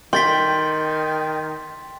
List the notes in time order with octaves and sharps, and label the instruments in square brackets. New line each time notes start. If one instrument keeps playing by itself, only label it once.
[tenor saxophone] D#3 [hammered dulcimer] G5 [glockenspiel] C6 A6 B6